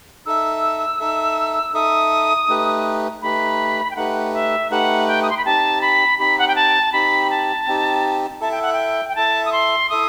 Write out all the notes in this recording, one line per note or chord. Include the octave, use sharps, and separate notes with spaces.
D#4 A4 E5 E6
D#4 A4 E5
D#4 A4 E5 D#6
A3 D#4 G4 B4
A3 D#4 G4 B4 B5
G5
A3 D#4 G4 B4 F#5
E5
A3 D#4 G4 B4 F#5
G5
D#6
C6
B5
C4 D#4 G4 A5
B5
C4 D#4 G4 B5
F#5
G5
A5
C4 D#4 G4 B5
A5
C4 D#4 G4
E4 A4 E5 A5
G5
F#5
G5
G5
E4 A4 E5 A5
D#6
C6
E4 A4 E5 D#6